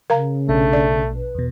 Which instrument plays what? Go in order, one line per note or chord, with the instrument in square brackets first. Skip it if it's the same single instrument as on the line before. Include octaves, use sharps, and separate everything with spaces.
[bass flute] C#3 [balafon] A#4 F5 A#5
[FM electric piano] A#1 B2 D4 [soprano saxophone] A3
[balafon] D5
[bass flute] B4
[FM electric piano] E2 B2